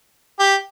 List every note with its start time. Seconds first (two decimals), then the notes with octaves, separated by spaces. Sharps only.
0.39 G4